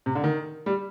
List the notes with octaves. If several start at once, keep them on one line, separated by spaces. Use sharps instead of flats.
C3
D3
D#3
G3